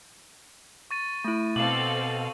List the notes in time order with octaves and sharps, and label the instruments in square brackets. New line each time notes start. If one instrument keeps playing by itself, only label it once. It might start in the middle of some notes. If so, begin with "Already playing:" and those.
[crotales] C#6 A6 D#7
[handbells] A3 E4
[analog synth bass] B2 [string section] C4 A4 F5 [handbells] D6 [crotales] F#7